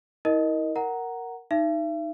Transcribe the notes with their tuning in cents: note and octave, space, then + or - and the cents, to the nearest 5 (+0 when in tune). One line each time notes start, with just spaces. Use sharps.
E4 -40 A#4 +0 D#5 +0
A#4 +0 F#5 +10 A#5 +0
D#4 +0 E5 +40